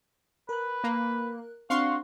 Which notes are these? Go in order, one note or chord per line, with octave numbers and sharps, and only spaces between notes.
A#4 B4 F#6
A#3
C4 D4 F#4 F5 C6 C#6